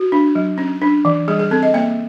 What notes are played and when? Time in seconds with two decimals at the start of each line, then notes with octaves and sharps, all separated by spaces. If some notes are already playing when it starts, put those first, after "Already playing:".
Already playing: F#4
0.12 D4
0.35 F#3
0.58 C#4
0.82 D4
1.05 E3
1.28 G3 G#4
1.40 G#4
1.51 C4 A4
1.63 D#5
1.74 A#3 E5